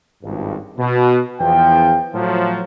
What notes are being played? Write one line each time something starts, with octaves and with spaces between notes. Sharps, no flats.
G#1 C#2 G2
B2
E2 F3 G5
A2 F3 F#3